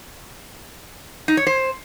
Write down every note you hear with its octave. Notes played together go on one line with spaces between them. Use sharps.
D#4
C#5
C5